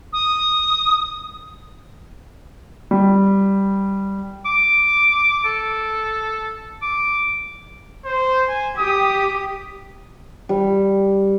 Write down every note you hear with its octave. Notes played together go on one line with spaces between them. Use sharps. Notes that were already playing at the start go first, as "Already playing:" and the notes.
D#6
G3
D6
A4
D6
C5
G#5
G4 D#6
G3